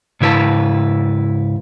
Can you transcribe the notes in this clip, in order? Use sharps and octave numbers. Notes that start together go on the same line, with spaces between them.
G#2 C#3 E4 B4 A5